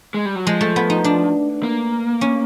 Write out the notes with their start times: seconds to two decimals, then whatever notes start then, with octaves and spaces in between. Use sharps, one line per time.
0.14 G#3
0.25 G3
0.35 F#3
0.46 F3 G#3
0.61 A3
0.76 B3
0.90 D#4
1.04 D4
1.63 A#3
2.21 C#4